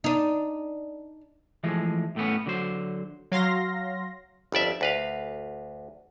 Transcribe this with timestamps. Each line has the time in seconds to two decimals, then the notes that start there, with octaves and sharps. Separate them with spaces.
0.04 D4 D#4
1.64 E3 F3 G#3 A3
2.16 A2 A3 B3 C#4
2.46 D3 F#3 C5
3.32 F#3 F5 C6 A#6
4.52 G1 F2 D5 E5
4.81 D2 B4 F5